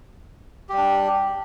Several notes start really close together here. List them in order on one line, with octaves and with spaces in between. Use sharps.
G4 G3 D4